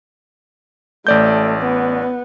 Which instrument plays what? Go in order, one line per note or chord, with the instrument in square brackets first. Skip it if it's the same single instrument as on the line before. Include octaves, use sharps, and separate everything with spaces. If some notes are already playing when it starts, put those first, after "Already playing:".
[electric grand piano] A1 D5 G6 [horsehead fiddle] A3
[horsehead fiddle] B3